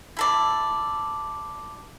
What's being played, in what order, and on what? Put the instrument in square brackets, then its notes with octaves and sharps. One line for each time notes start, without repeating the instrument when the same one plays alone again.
[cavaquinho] E4 A4 D5